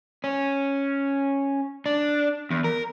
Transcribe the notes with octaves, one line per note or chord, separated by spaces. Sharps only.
C#4
D4
E2
A#4